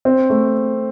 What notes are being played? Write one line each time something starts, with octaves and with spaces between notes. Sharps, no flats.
C4
A3